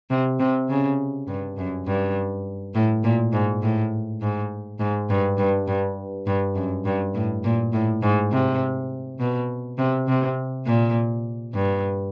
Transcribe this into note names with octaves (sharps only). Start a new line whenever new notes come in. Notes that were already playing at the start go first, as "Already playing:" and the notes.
C3
C3
C#3
G2
F#2
G2
A2
A#2
G#2
A2
G#2
G#2
G2
G2
G2
G2
F#2
G2
A2
A#2
A2
G#2
C3
B2
C3
C3
A#2
G2